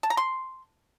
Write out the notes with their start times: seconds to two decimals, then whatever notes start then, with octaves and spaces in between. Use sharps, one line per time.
0.03 A5
0.10 A#5
0.17 C6